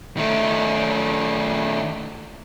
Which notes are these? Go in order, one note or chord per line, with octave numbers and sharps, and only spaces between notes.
D#3 A3